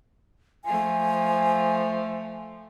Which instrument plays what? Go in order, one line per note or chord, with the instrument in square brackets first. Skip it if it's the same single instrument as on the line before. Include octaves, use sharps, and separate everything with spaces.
[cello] F3 A3 [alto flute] G#5